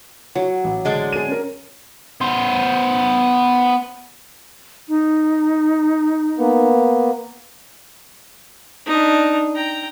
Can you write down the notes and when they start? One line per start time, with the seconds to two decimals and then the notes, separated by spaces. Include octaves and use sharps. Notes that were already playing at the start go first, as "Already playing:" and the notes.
0.35 F#3
0.64 A1
0.85 D3 G#3 D4
1.13 G#4 D#7
1.28 C#4 A#4
2.21 B3 C5
4.88 D#4
6.38 A#3 B3
8.86 D4 D#4
9.55 G5 A#5